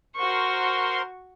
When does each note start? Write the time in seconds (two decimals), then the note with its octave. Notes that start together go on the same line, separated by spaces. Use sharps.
0.16 F#4 A#4 C5 C6 C#6